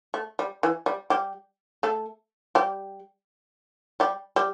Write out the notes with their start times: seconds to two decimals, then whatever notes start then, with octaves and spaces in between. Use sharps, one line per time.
0.14 A3
0.39 G3
0.63 E3
0.86 G3
1.10 G3 G4
1.83 A3 A4
2.55 G3 G4
4.00 G3 G4
4.36 G3 G4